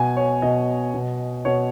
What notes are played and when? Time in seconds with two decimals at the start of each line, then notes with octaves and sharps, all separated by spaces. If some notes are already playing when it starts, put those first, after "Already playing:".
Already playing: B2 G#5
0.17 C#5
0.42 B2 D#5
0.94 B2
1.45 B2 C#5